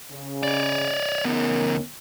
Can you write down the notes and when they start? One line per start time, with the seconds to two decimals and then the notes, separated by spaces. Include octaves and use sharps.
0.11 C#3
0.43 C#5 D5
1.25 D2 B3 C#4 D#4 A#4